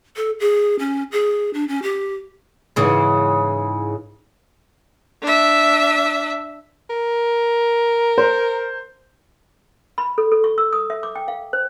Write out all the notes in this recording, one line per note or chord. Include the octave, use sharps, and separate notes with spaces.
A4
G#4
C#4
G#4
D4
C#4
G4
G#2 C#3 E3
D4 E5
A#4
C5
B5
A4
A4
C#6
E6
D#6
E5
D6
G5
F5
C5